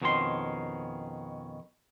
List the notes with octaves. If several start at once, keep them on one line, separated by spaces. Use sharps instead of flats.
F2 B2 D#3 C#4 A4 C6